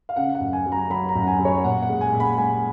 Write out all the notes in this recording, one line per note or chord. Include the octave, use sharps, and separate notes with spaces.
F5
C#3 F#5
F#5
F#2
G#5
F#3
A#5
F#3 B5
A#5
F#2
F#5
G#5
F#3
C#5
A#2 F#5
F#5
G#3
G#5
A#2
B5
G#3 G#5